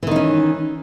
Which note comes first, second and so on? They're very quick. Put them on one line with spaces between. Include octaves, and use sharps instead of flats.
E3 D#3 D#4 C#4